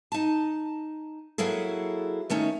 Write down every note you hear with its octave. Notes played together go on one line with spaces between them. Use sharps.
D#4 A5
F#3 A#3 E4 G#4 A4
D#3 A3 C#4 D#4